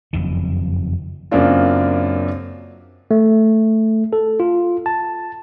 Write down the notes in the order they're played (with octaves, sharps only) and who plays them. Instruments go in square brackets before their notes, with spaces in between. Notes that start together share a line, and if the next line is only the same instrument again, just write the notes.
[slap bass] F#1 F2 D#3
[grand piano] F#2 C#3 A#3 C4 D4 F4
[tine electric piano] A3
A4
F4
A5